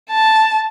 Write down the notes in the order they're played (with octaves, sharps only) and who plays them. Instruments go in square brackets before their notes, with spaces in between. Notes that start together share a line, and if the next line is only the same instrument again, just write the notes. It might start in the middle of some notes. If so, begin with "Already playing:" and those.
[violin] A5